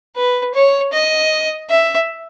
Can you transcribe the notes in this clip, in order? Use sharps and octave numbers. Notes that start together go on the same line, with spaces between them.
B4
C#5
D#5
E5